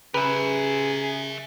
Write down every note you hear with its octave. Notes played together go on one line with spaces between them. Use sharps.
C#3 G#4 A#4 B4 E5